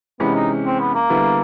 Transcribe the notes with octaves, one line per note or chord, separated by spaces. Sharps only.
C3 E3 G#3 B3 C#4
D#4
C4
B3
A#3
D3 G3 B3 E4